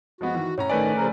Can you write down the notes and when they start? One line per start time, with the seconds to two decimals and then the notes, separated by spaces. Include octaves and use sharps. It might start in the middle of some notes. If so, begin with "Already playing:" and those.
0.21 F3 G#3 B3 F#4
0.34 D#3 E3
0.58 A2 C#4 C#5 A#5
0.70 D#3 A3 B4 D5 G#5
0.97 C#3 F3 A#4